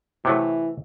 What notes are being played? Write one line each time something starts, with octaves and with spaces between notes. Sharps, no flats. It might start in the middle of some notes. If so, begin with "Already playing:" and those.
C3 E3 F#3 A3